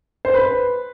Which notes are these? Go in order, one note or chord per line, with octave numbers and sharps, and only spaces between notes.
C5
B4